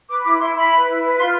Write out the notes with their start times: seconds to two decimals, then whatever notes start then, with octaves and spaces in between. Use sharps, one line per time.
0.09 B4 D6
0.24 E4 D6
0.40 E4 C6
0.55 E4 B5
0.72 B4
0.87 E4
1.02 B4
1.18 F4 C6